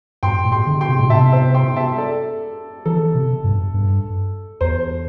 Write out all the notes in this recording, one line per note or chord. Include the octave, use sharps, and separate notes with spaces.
G2 G5 C6
A2
G5 C6
D3
G5 C6
C3
A2
C3 E5 A5
C5 E5
G5 C6
E5 A5
A4 D5
E3 A4
C3
G2
G2
E2 C5